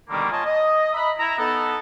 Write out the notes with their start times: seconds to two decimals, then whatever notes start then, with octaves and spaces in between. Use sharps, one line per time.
0.10 B2 D3 D#3 G3 A#3
0.30 A#3 F4 C#5 D#5 G#5 A5
0.46 D#5
0.93 D#5 E5 A#5 B5
1.19 E4 A#5
1.38 B3 D#4 A4